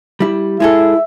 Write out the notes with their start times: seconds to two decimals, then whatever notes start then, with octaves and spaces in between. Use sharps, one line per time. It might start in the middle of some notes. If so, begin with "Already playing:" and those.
0.20 G3 E4
0.60 G#3 E4 G#4 A4 E5